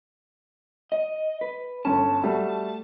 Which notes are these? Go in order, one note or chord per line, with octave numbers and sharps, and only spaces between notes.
D#5
B4
G1 C#4 A5
G3 A3 F#4